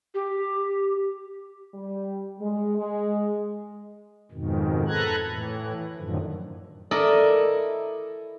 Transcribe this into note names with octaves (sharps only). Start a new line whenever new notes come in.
G4
G3
G#3
G#3
F2 G#2 B2 D#3
A4 B4 A#5 F#6 G#6
A2 E3
F#2 A2 D3 D#3 F3
E4 A4 A#4 D5 D#5